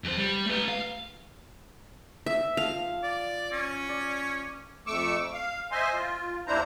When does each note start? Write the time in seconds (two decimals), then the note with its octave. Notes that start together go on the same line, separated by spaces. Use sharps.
0.04 F2 C5
0.18 G3
0.46 A3 B4
0.68 F5
2.26 E5
2.57 F3 F5
3.03 D5
3.52 C#4
3.89 D5
4.87 F2 A3 C#6 D6 E6
5.33 F5
5.72 C5 D#5 E5 G#5 C6
5.94 F4
6.47 D#2 D4 E4 C5 A#5